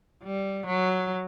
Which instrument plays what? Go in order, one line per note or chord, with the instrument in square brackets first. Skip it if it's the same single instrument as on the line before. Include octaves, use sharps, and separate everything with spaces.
[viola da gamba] G3
F#3